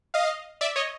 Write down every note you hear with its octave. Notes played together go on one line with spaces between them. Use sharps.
D#5 F5
D5 E5
C#5 D#5